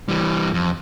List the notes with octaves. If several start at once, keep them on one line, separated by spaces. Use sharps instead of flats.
E3 G3
F2